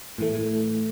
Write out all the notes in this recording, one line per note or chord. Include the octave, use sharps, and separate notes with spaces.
A2 E3 A3